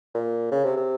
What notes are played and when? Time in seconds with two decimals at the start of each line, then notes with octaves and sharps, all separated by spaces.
0.14 A#2
0.51 C#3
0.64 C3
0.77 C3